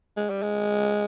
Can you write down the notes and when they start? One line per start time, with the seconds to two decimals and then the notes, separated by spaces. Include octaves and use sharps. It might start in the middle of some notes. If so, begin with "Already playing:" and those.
0.17 G#3
0.30 G3
0.43 G#3